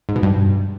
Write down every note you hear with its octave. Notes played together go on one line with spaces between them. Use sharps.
G#2
B2
G2